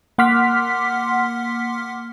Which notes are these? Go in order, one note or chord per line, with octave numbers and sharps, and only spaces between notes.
A#3 F#5 C6 D6 F6 B6